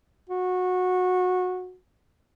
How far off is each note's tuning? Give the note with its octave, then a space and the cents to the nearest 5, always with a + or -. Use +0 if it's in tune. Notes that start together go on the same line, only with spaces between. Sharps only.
F#4 -20